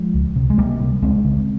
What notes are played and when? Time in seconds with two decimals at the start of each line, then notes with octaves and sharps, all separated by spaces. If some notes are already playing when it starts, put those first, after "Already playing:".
Already playing: F3 G#3
0.14 C#2
0.36 C3
0.50 G#3
0.58 C#2 G3 A#3
0.80 C3
1.02 C#2 G#3 C4
1.24 C#3